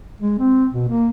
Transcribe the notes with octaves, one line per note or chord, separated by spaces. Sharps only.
G#3
C4
B2
A#3